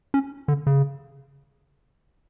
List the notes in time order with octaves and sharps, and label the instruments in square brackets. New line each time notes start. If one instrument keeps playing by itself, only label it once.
[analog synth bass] C#4
D3
C#3